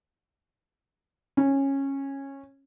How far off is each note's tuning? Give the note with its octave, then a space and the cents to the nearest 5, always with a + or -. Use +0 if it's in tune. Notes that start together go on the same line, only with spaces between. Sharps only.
C#4 -15